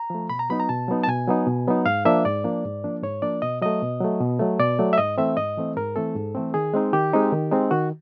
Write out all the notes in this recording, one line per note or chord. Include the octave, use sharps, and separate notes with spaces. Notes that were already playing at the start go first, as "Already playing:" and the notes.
Already playing: A#5
F3 A3
B2 B5
A#5
F#3 B3 D#4 B5
A#5
B2 A5
F#3 B3 D#4
A5
B2 G#5
F#3 B3 D#4
B2
F#3 B3 D#4
G#2 F5
F3 A#3 D4 E5
G#2 D5
F3 A#3 D4
G#2
F3 A#3 D4
G#2 C#5
F3 A#3 D4 D5
B2 D#5
F#3 A3 D#5
B2
F#3 A3
B2
F#3 A3
B2 D5
F#3 A3
E5
G#2 D#5
E3 A3 C4 E5
G#2 D#5
E3 A3 C4
G#2 A#4
E3 A3 C4 A4
G#2
E3 A3 C4
D#3 G#4
G#3 C4 D#4
D#3 G4
G#3 C4 D#4
D#3
G#3 C4 D#4
D#3 F#4